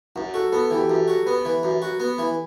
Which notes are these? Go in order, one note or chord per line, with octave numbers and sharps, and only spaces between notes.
F#2 F#4
F#4 A4
B3 A4
E3 G4
F#2
F#4
B3 B4
E3
F#2
F#4
B3
E3